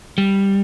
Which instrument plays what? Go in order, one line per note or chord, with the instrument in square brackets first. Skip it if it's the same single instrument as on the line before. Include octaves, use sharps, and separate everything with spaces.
[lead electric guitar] G3